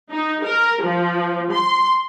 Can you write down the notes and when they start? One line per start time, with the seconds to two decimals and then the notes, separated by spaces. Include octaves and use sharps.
0.10 D#4
0.44 A#4
0.82 F3
1.51 C6